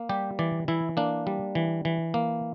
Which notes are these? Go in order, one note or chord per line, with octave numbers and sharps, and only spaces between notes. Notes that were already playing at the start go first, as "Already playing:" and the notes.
Already playing: A#3
G3 G4
E3 D5
E3 E4
A#3 D4
G3
E3
E3
A#3